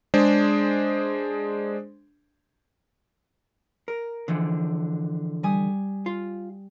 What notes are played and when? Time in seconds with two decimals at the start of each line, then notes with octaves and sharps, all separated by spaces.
0.14 G#3 D4 G#4 C5
3.88 A#4
4.28 D3 E3 F3
5.43 G3 G#5 D#6
6.06 F4